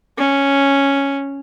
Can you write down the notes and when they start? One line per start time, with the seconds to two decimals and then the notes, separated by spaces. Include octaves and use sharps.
0.18 C#4